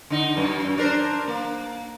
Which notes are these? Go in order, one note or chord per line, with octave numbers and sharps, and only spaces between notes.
D3 D#4
F#2
D4 A#4 C5
A#3